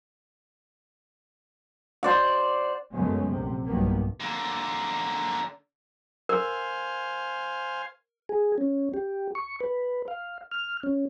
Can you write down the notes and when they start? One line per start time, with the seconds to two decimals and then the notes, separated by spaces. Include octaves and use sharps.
2.03 C5 D5 F#5
2.94 F#2 C#3 G#3 A3 B3
3.28 A#1 C3
3.66 B1 G2 D#3 A#3 B3
4.20 D3 A#3
6.29 A#4 C5 F5 G#5
8.29 G#4
8.58 C#4
8.94 G4
9.35 C#6
9.60 B4
10.08 F5
10.51 F6
10.83 C#4